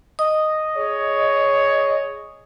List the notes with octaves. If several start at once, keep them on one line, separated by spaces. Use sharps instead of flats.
D#5 D#6
G#4 C#5